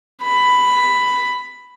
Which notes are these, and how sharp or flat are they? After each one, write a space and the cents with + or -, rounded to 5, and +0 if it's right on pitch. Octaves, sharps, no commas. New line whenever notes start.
B5 +10